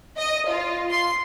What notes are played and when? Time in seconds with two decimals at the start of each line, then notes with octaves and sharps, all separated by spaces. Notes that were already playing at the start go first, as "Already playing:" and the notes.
0.17 D#5
0.47 F4
0.90 C6